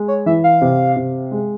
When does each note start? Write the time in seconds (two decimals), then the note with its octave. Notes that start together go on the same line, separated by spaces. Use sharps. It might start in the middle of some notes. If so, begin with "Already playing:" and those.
Already playing: G#3
0.08 C#5
0.26 E3 E5
0.44 F5
0.62 C3
0.96 C3
1.32 G#3